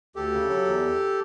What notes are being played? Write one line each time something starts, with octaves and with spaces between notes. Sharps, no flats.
D2 G4 A4
C#3
F#3
E2